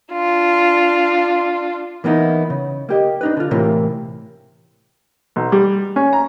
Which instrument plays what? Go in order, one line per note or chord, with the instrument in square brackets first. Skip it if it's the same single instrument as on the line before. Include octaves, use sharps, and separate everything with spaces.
[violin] D4 F4
[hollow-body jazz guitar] E3 A#3 B3 D#4 E4
C#3
A#3 G4 D#5
D4 D#4 B4
D3 F4
A2 C3 E3 A#3
[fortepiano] B1
G3
C#4
A#5